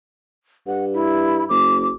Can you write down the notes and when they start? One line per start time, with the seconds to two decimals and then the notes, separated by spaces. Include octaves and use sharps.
0.67 G2 F#5
0.94 E4
1.49 F#1 D6